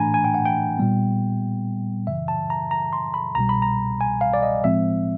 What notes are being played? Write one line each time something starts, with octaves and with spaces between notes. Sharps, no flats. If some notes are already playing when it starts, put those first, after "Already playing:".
Already playing: A2 E3 A3 D4 G#5 A#5 B5
G#5
G5
F#5
G5
A#2 G3 B3
F#2 C#3 E3 E5
A5
A#5
A#5
C6
B5
C2 B2 G3 A#5
B5
A#5
G#5
F5
D5
D#5
A2 F3 G#3 C4 E5